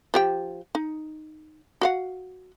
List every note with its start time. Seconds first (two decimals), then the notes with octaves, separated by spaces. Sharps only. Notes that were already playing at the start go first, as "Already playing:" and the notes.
0.14 F3 G4 G5
0.75 D#4
1.81 F#4 F5 F#5